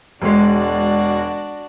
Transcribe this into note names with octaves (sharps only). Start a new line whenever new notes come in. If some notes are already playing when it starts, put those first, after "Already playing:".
E1 G#3 D4 F#4 D5